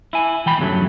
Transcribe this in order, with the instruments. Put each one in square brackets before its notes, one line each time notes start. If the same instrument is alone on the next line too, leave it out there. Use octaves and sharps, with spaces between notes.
[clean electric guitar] E4 G#5
E3 G5 B5
E2 G2 C#3 F#3 A3